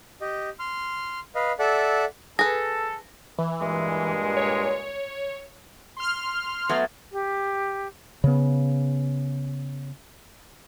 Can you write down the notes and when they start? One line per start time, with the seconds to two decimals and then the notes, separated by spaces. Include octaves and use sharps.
0.21 G4 D#5
0.59 C6 F6
1.35 B4 D#5 F5
1.59 A4 D5 E5 F#5
2.39 G#4 A4 B4 A#6
3.38 E3
3.61 G2 A#2 G#3
4.37 C#5
5.97 C6 F6
6.69 F#3 A3 B3
7.11 G4
8.24 C#3 B3